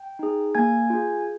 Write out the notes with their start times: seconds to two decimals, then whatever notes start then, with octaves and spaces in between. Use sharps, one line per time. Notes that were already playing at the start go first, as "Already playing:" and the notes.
Already playing: G5
0.19 D#4 G#4
0.55 A#3 G#5 G#6
0.90 F4 G#4